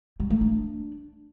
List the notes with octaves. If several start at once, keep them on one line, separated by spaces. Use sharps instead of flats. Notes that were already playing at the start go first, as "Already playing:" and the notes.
G3
A3
D4